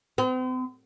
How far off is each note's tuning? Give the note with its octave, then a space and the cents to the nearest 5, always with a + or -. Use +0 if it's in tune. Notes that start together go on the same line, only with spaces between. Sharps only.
C4 -40